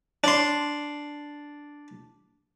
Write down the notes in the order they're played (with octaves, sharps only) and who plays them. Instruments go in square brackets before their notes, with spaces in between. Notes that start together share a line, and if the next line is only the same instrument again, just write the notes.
[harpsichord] D4 C6